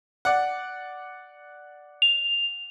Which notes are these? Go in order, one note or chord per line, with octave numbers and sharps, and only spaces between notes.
D5 F#5
F7